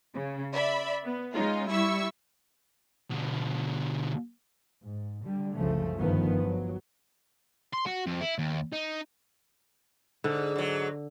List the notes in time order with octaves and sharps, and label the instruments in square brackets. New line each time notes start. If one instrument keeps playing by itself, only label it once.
[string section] C#3
D5 E5 B5
B3
G#3 C#4 D#4 F4
G3 E4 E5 C#6 E6
[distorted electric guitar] B2 D3
[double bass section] G#2
D3 G3
F#1 C2 C#3 F3 A3
G1 G2 D#3 F3 B3
F#3
[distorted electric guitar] C6
F#4
F2
E4
D#2
D#4
[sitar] G#2 [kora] D3
[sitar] G#2 F#3